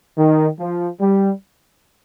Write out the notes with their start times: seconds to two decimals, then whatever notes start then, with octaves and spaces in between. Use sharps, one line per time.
0.17 D#3
0.58 F3
1.01 G3